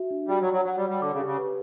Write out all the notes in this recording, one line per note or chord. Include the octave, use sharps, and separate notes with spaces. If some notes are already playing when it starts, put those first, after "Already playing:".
Already playing: F#4 E5
D4
G3 F#4
F#3
F#4
F#3
F#3 C#5
G3
F#5
G3
D3 D6
C#3
G4
C#3
B4